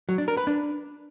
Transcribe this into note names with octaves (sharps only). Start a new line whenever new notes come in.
F#3
D4
A#4
B4
D4